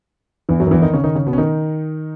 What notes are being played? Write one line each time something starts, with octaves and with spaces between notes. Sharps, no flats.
E2 E3
F#2 F#3
D#3
E2 E3
D#3 D#4
C#3 C#4
D#3 D#4
C#3 C#4
B2 B3
C#4
D#3 D#4